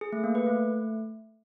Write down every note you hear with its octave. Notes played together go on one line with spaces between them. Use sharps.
G#4
A3
A#3
B4
A3